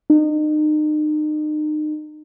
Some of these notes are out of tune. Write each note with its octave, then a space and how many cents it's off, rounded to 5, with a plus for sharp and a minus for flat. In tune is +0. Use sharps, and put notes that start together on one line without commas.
D#4 -35